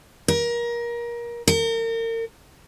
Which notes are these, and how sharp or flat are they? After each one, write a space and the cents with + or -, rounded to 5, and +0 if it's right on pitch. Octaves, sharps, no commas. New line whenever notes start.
A#4 +25
A#4 -35